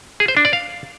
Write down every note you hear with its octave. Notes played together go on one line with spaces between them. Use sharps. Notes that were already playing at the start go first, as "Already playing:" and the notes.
G#4
C5
D4
D5
F5